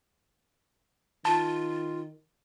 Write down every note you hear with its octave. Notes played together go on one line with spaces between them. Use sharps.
D#3 F4 A5